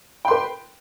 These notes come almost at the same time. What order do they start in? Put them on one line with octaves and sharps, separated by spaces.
G5 C6 B4